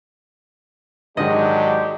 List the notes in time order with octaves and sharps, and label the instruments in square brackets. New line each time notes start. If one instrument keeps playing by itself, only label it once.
[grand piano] G#2 D#3 [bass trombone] F#3 [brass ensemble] G#3 D4 G4 [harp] D#5